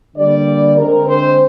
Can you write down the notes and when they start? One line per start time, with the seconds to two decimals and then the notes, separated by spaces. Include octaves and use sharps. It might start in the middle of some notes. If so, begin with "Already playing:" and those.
0.15 D3 G3 A#3 D5
0.77 D3 G#3 C4 A#4
1.07 C5